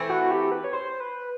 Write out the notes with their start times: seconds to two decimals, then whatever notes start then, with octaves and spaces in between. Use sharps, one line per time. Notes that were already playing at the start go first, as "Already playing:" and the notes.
Already playing: E3 A3 C4
0.09 F#4
0.31 G4
0.52 B4
0.64 C#5
0.73 C5
1.00 B4